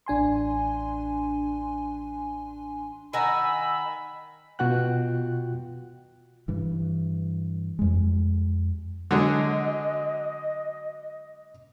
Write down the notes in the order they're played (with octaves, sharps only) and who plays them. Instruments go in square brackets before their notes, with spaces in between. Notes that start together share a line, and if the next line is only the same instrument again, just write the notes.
[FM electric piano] A1 D4 G#5 C6
[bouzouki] D#3 F#5 [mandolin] G#5 A#5 [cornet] B5 [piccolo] E6
[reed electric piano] B2 F4 F#4 F#5 G5 F#6
[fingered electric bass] G2 E3
F2 G#3
[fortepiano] D3 F#3 G#3 [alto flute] D#5